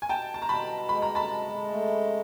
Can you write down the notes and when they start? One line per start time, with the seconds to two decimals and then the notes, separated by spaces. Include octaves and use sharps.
0.02 G#5
0.09 B2 G5 A5
0.34 A5
0.42 A#5
0.49 B2 A5 B5
0.89 G#3 B5
1.02 A#5
1.15 A5 B5
1.30 G#3
1.71 A3